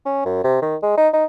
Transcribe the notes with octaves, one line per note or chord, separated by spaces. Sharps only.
C#4
F#2
C3
D#3
G#3
D#4
D#4